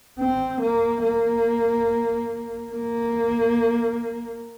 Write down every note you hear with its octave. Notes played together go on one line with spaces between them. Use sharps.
C4
A#3
A#3
A#3